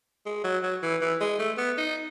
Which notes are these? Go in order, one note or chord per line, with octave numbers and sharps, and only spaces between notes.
G#3
F#3
F#3
E3
E3
G#3
A3
B3
D#4